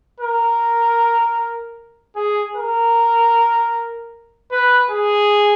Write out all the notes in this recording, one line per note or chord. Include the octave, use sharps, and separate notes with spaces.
A#4
G#4
A#4
B4
G#4